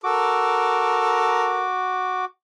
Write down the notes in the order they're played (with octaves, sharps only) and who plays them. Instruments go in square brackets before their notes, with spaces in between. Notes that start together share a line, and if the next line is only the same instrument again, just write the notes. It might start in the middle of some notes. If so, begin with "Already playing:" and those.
[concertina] F#4 D6 [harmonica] A4 A#4